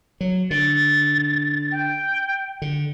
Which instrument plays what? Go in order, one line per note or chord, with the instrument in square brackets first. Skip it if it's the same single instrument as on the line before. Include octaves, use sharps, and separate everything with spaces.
[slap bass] F#3
[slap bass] D3 [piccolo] A6
[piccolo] G5
[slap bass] D3